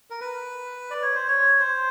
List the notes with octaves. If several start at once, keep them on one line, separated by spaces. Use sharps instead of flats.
A#4
B4
D5
C#5
C5
C#5
C5